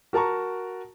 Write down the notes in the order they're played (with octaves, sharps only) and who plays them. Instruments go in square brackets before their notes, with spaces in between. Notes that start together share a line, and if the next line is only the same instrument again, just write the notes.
[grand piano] F#4 A#4 A5 A#5 C#6